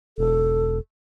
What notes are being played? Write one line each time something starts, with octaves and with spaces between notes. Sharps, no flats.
E1 A4